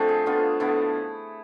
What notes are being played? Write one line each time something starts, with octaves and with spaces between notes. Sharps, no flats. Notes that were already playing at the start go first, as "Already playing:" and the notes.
Already playing: D3 F3 A3 C4
G#4
D3 F3 B3 F4
D3 F3 B3 E4